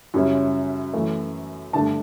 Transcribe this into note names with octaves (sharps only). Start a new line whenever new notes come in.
F#2 C#3 G3 C#4 E4
F#2 E3 A3
G2 D3 A3 D4 A5